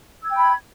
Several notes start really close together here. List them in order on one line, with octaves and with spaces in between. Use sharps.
E6 G#6 G5 B5